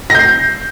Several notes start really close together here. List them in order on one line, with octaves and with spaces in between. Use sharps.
A#6 G6 C7